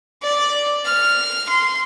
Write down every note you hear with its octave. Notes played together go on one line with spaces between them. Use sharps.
D5
F6
C6